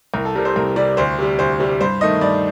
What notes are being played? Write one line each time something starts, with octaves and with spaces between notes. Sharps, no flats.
C2 A#4
A4
C3 G3 A#4
C5
C2 A#4
C3 G3 D5
D2 C5
C3 G3
D2 C5
C3 G3
G2 C5
D#3 A3 D#5
G2 D5